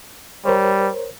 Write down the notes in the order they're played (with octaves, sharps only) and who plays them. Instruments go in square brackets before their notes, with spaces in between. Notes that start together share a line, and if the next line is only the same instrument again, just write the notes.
[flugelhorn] G3 [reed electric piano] A#4 C5 C#5